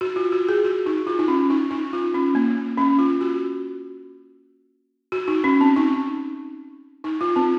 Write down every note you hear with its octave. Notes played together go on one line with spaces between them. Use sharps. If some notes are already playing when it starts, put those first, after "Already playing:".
F#4
F4
F#4
G#4
F#4
D#4
F4
D#4
C#4
D#4
D#4
F4
C#4
A#3
C#4
F4
F#4
F#4
D#4
C#4
C4
D#4
D#4
F4
C4